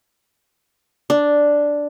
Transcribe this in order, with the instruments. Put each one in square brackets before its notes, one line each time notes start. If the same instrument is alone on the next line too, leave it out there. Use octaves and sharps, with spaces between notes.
[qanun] D4